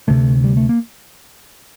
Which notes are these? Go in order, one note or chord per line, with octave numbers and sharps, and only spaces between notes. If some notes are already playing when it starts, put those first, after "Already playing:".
D2 C3 A3
G3
A3
A#3